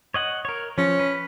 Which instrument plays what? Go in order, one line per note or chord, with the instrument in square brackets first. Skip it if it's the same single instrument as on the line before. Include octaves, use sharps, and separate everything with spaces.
[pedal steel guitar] C#5 D#5 F#5
A#4 C#5
[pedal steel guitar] F3 [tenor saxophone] C#4
[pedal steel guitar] B4